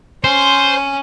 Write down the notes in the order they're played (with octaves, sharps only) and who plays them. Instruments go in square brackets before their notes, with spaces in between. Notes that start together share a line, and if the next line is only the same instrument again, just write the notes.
[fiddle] C#4 [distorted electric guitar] C5